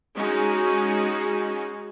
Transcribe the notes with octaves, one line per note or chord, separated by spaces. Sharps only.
G#3 C#4 D#4 F#4 G#4